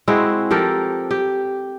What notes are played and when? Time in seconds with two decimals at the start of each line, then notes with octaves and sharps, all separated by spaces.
0.08 G#3 C4 E4 F#4
0.51 F3 G4 A4 A#4
1.11 G4